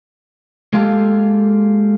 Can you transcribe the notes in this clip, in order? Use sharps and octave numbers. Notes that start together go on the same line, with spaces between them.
G#3 A#3 F4 G4 A4